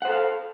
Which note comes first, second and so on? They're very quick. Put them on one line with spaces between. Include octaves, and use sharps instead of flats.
F#5 C5 A4 F5